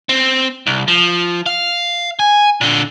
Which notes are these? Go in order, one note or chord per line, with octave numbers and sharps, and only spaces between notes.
C4
C2
F3
F5
G#5
A#2 D3